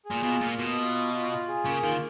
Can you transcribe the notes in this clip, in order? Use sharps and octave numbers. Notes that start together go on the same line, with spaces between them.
A#2 G#4
B2 F4
A#2 A#3
B2 D#5
F4
D#5
F4
F4
G#4
C#3 A#3
D#3 F4